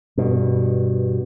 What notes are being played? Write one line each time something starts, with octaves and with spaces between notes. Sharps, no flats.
G2 B2